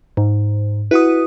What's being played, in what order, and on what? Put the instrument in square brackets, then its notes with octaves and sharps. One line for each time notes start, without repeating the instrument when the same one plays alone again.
[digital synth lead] G#2
[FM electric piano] E4 F#4 D#6 [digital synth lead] B4